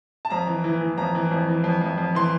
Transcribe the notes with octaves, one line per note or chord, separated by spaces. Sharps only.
A5
F2 A#5
E3
E3
E3
F2 A#5
E3
F2
E3
F2
F2
F2
E3 C6